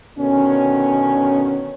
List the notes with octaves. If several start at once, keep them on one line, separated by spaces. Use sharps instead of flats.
B2 D3 D#3 C#4